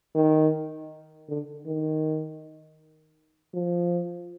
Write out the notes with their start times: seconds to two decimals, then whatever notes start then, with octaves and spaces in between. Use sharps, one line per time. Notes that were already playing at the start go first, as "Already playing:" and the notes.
0.15 D#3
1.29 D3
1.66 D#3
3.54 F3